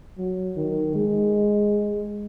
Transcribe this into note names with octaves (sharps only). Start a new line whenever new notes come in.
F#3
D#3
G#3